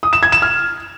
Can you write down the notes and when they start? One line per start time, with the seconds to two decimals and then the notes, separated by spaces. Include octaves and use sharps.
0.03 D#6
0.13 E7
0.23 G#6
0.32 E7
0.42 F6